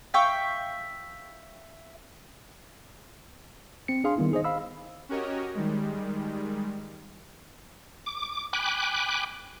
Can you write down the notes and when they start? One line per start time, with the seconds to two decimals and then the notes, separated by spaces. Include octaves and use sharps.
0.14 E5 F5 G5 C#6
3.88 C4 C#7
4.04 D4 G#4 F5 C6
4.17 D#3 G3 B3 E4
4.32 D#4 G#4 C5 D#5
4.44 F5 B5 E6
5.09 C#4 F#4 G4 A#4 C#5 D#5
5.55 D#3 G3 G#3
8.06 D6
8.53 G5 G#5 B5 D6 F#6